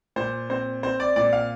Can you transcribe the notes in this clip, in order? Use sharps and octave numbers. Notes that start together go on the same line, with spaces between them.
A#2 C5
C4 C5
C4 C5
D5
A#2 D5
F5